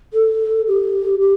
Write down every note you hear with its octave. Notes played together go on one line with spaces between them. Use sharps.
A4
G4
G4